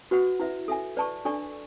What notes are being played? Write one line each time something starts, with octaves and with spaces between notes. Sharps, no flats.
F#4 B4 F#5
E4 B4 E5
A4 E5 G#5
B4 D5 A5 C#6
D4 A4 D5 G#5 C#6